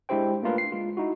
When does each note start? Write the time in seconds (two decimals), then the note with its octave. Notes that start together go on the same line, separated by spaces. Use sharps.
0.09 G#3 D4 E4 G4 C5 G5
0.43 A3 A#3 D4 F4 A#4 B4
0.58 C7
0.72 G#3 F4
0.97 D#4 E4 F#4